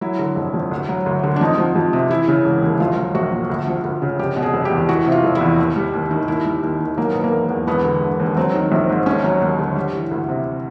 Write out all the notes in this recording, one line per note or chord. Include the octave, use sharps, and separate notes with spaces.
F#3 E4
D3
F1
F2
D2
F#3
D2
D3
D4
F2 D#4
F3
F2
C3
E3 E4
C#3
E1
D#2
A#1 F4
F#3
A#1 F#4
A#2
D2
F3
D2
C#3
F1 G4
B2
G#4
F1
G4
E2
E3 F#4
C3
F4
F1
E4
E2
D#2
G3
D#2
D#3
D#2 E4
G3
D#2
D#3
F#3 A#3
B2 B3
A#3
E1
E2
E1 B3
D3
E1
D#2
F#3 C4
D#3
A#1
G#2
D#2 C#4
F#3
D#2
D3
G3
E3
D2
C3